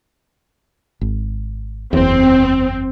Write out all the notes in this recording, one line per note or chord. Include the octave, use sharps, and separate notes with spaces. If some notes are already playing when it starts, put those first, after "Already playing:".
G#1
F#1 E2 C4